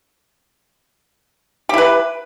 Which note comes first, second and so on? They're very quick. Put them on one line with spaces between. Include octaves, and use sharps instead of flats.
G4 E4 B4